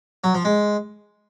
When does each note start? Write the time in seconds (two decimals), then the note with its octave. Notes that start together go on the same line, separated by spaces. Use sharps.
0.24 F#3
0.34 F3
0.45 G#3